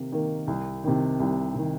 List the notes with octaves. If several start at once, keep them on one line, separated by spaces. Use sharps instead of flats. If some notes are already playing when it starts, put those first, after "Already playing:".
Already playing: C3 D#3 A#3
D#3 A#3
C2
C3 D#3
C2
C3 D#3